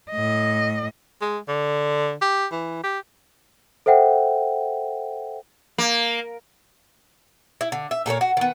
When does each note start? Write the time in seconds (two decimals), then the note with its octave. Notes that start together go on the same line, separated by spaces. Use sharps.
0.11 A2 D#5
1.22 G#3
1.49 D3
2.22 G4
2.52 E3
2.84 G4
3.86 A4 C5 E5 F#5 G5
5.78 A#3
7.61 E4
7.72 D3
7.91 E5
8.06 A#2 A4 A#4 C#5
8.21 F#4
8.37 D#3 B3